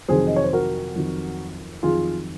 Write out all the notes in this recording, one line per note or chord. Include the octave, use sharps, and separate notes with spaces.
F2 C3 D#3 F#3 G#4 C5
D#5
C#5
C5
F#4 A#4
F2 D#3 F#3
F2 D#3 F#3 F4 G#4